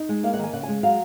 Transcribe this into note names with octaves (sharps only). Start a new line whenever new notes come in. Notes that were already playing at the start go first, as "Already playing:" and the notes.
Already playing: D#4
G#3
A#3 F5
F#5
D#3 G#5
C#3 F#5
G#5
G#3
F#3 F5